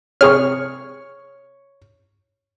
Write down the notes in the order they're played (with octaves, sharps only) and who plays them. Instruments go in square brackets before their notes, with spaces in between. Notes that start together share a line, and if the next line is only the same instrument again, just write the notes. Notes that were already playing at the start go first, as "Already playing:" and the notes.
[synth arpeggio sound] C3 G#4 F6 [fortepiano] C#5 C#6